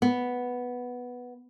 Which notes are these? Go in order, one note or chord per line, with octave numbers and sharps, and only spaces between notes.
B3